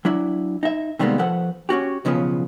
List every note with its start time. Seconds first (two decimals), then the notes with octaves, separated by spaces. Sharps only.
0.05 F#3 D4 E4
0.63 D#4 E5
0.99 C3 D#3 G3 G#3 A#3 B3
1.19 F3 A4 B4 C5 F#5
1.69 C#4 D4 F#4 G4
2.05 B1 C#3 F3 B3 B4